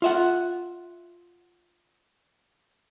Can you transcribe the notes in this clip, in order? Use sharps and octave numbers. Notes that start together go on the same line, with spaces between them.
F4 E5 F#5